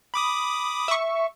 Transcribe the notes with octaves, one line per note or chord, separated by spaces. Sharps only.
B5 D6 D#6
E5 C#6